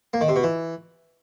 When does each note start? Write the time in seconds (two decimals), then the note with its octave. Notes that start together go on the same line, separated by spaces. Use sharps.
0.13 A#3
0.21 D#3
0.28 C3
0.36 B2
0.43 E3